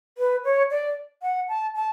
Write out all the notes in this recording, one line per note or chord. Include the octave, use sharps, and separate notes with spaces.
B4
C#5
D5
F#5
A5
A5